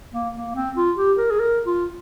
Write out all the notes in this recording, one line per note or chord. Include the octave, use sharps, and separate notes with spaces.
A#3
A#3
C4
F4
G4
A#4
G#4
A#4
F4